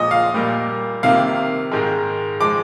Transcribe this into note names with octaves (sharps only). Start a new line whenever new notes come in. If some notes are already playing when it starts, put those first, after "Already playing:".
Already playing: A#2 F3 G#3 D#5
F5
A#2 G3 A#3
C3 D#3 A#3 F5
G#2 D#3 G#3
F3 G#3 D6